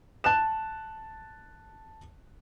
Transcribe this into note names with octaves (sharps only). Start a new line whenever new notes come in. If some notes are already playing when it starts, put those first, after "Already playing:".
A5 F#6 E7